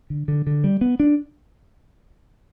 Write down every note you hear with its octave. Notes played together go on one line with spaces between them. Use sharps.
D3
D3
D3
G3
B3
D4